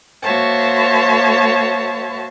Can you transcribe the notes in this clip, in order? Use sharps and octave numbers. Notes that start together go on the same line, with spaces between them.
A#3 F#4 C5 C#5 E5 A5